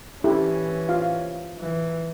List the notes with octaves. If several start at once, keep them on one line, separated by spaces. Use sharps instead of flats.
E3 C#4 E4 G4 A4
F4 F5
E3